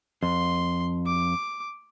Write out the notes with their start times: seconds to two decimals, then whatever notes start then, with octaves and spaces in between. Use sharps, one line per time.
0.23 F2 C6
1.06 D6